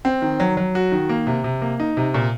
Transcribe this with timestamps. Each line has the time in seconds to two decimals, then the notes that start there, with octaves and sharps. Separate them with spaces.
0.05 C4
0.22 D#3
0.40 F#3
0.57 F#3
0.75 F#4
0.92 D#3
1.09 A#3
1.27 C3
1.44 C3
1.62 A#3
1.80 D#4
1.97 C3
2.14 A#2